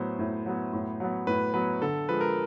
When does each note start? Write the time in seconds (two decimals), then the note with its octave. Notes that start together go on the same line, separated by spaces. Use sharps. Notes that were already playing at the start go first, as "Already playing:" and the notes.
Already playing: A2 F#3 B3 C5
0.19 A2
0.46 F#3 B3
0.73 A2
1.00 F#3 B3
1.27 A2 B4
1.54 F#3 B3 B4
1.81 D3 A4
2.08 F3 G#3 B4
2.21 A#4